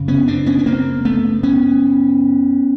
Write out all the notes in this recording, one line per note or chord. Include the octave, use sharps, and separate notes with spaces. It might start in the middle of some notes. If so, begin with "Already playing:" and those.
Already playing: F#2 C#3
B3 C#4
C4 D4
B3 C#4
C#4
A#3 C4
A3 B3
B3 C#4